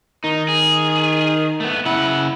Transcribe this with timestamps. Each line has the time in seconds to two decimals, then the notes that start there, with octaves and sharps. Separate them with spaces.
0.24 D#3 D#4
0.49 G#4
1.60 A3 B3
1.86 C#3 E4 F#5